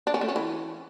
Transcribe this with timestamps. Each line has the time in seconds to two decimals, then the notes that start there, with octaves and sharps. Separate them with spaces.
0.07 D4
0.14 C#4
0.21 A3
0.29 C#4
0.36 E3